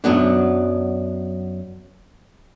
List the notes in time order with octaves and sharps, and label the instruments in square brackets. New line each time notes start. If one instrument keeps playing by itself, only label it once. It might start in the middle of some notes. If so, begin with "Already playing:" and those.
[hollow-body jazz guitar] F#2 F#3 B3 D4